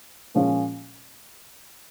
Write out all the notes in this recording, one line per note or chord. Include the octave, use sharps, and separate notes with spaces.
A#2 F3 G#3 C#4